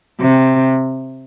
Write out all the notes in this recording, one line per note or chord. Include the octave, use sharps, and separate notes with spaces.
C3